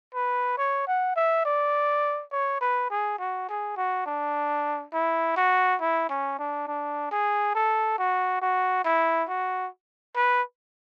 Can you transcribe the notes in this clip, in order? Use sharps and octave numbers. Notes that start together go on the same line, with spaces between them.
B4
C#5
F#5
E5
D5
C#5
B4
G#4
F#4
G#4
F#4
D4
E4
F#4
E4
C#4
D4
D4
G#4
A4
F#4
F#4
E4
F#4
B4